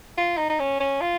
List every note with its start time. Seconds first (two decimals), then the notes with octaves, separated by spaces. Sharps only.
0.18 F4
0.38 D#4
0.50 D#4
0.60 C#4
0.80 C#4
1.01 F4